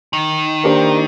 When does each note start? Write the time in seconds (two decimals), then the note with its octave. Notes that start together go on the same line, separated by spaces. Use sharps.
0.13 D#3
0.64 A#3 D4 G4 C5